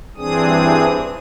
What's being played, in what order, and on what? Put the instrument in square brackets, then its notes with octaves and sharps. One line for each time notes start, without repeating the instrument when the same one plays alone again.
[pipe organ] G2 E3 C4 D4 G#4 D#6